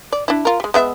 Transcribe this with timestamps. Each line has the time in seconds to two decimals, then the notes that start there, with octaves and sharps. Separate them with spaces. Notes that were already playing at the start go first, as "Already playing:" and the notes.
0.12 D5
0.28 D4 E4
0.45 F4 A#4
0.60 G3 G#3
0.74 G#3 B3 E5